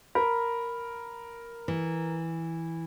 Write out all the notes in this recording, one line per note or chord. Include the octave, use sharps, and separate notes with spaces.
A#4 B5
E3